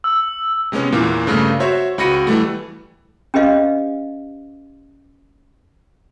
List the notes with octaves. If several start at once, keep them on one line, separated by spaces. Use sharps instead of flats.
E6
C3 G#3 B3 C#4
E2 A#2 E3 A#3
G2 C#3 A3 A#3
F#4 C5 C#5 E5
C#2 F#4 B5 A#6 C#7 D#7
E3 G3 A3
C#4 G4 B4 D#5 F5